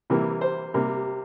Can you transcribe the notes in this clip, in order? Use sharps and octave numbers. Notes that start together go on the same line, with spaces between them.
C3 E3 G3 A#3
C5
C3 G3 A#3